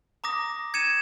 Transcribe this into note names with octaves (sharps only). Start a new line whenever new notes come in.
A#5 D6 D#6 A#6
G#6 C#7 D#7 E7